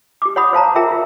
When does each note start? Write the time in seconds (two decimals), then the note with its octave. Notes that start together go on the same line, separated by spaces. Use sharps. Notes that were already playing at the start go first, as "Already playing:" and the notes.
0.22 G4 D6
0.36 C#5 F#5 B5 D#6
0.53 C5 F5 A5 A#5
0.75 F4 G#4 A#4 E5 G5 A#5
0.91 F4